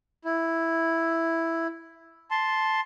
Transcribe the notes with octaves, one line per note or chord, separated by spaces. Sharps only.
E4
A5 C6